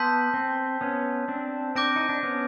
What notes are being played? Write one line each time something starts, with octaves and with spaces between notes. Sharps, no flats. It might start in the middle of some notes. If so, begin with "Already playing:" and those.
Already playing: B3 A5 C6 E6 G6 B6
C4
B3 C#4
C4 D4
C4 D4 D6 G6 A#6 D7
D#4
D4
B3 C#4